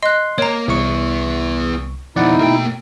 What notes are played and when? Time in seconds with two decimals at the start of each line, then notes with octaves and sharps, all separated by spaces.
0.03 D#5 C6 F#6
0.38 A#3 C#5 A#5
0.68 C2 B3 E4 C#6
2.16 F2 B2 D#4 E4 D5 F#5
2.40 B2 A3 A#3 G5